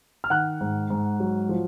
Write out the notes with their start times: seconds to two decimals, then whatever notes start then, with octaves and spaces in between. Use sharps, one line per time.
0.24 F6
0.30 D#3 F#5 F#6
0.61 G#2
0.90 G#2
1.20 F#3
1.49 F3